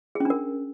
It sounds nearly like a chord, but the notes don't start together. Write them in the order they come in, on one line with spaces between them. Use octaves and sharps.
G#4 C#4 D4 A#4